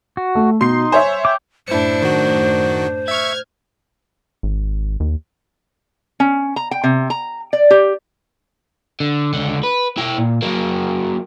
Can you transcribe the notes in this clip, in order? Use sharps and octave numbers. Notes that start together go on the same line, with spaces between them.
F#4
A3
B2 D#4 C6 C7
C5 C#5 E5 G#5
G5 D6
F#2 A2 D4 E4 C5 C#7
D#3 F#4
E5 C#6 F6 G#6
G#1
D#2
C#4
A#5
G5
C3
A#5
D5
G4
D3
C#2 D3
B4
E4 G5
A#2
F#3 A#3